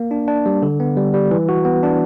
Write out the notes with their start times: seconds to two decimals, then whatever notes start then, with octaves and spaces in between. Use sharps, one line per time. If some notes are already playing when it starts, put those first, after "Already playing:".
Already playing: A#3
0.11 D4
0.28 D4
0.46 G3
0.62 D3
0.80 B3
0.97 G3
1.14 G3
1.31 E3
1.49 F#4
1.65 B3
1.83 D4